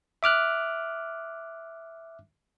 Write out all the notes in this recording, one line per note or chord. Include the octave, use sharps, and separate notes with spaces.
E5 D6 F6 F#6